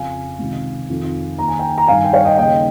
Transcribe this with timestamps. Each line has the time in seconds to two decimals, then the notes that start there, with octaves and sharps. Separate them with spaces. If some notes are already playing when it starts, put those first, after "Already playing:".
Already playing: F2 C#3 F5 G#5
0.39 C#2 C3 D#3
0.90 F2 D#3
1.39 D#2 D#3 A#5
1.48 G#5
1.59 G5 A#5
1.78 A#5
1.88 G2 D#3 F5 G#5
2.04 G5
2.13 C#5 F5
2.25 D#5 G5
2.38 D#2 C#3 D#5 G5